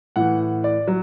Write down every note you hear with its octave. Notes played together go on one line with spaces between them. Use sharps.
A2 E3 F#5
D5
F#3